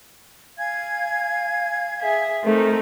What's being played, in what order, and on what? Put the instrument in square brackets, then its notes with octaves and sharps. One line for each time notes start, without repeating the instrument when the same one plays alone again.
[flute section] F5 G#5 G#6
[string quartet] G#4 E5
[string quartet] A3 C4 D#4 [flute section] A#4